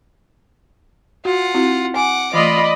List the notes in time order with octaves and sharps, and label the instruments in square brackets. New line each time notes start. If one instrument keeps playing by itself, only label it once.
[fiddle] F4 F#5 [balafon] F#4
[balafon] C4 E4 F#4
[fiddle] F#5 D6 [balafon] G#5
[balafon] E3 A3 [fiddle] F4 [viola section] D5 D#5 B5